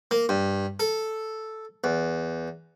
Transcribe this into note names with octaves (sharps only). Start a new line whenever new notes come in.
A#3
G2
A4
E2